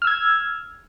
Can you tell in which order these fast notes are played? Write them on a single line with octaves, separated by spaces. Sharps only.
F6 E6 G#6